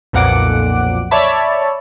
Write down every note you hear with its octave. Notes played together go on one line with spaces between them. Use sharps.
B1 F2 A#2 F#5 D6 D7
C#5 D5 E5 A5 B5